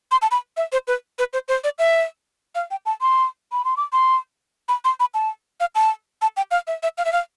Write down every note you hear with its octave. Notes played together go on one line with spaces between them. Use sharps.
C6
A5
B5
E5
C5
B4
B4
C5
C5
D5
E5
F5
G5
A5
C6
B5
C6
D6
C6
B5
C6
B5
A5
F5
A5
A5
G5
F5
E5
E5
F5
E5
F5